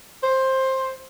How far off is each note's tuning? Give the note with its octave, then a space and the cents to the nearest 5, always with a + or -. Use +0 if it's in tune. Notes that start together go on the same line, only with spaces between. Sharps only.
C5 +15